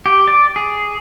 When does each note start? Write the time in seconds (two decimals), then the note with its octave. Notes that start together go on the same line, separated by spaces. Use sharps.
0.06 G4
0.28 D5
0.56 G#4